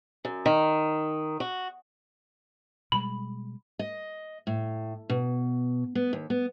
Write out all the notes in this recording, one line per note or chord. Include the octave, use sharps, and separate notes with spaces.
F#2
D#3
F#4
B2 G3 G#3 B5
D#5
A2
B2
B3
D#2
B3